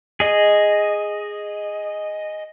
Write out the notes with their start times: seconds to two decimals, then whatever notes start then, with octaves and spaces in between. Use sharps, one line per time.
0.20 G#4 D#5